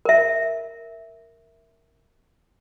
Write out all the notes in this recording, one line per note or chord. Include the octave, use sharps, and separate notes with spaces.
A#4 E5